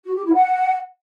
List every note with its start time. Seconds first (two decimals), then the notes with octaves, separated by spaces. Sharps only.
0.04 F#4
0.14 G4
0.24 E4
0.34 F#5